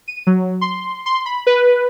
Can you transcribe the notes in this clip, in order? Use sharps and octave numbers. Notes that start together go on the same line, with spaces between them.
D#7
F#3
C6
C6
B5
B4